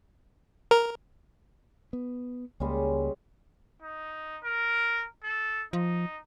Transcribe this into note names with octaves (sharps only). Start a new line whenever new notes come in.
A#4
B3
C#2 G3 G#3 A#3 C#4
D#4
A#4
A4
F3 D#4